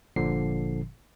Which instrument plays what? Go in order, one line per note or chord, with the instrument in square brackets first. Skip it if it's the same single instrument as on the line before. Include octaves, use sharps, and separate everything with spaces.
[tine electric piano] G1 A#2 D3 F3 C7